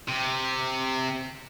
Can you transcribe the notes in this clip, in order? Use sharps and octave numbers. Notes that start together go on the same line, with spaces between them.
C3